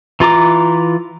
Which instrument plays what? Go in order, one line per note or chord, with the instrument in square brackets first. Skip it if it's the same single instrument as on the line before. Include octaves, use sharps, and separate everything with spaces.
[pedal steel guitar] E3 F4 A#5 D6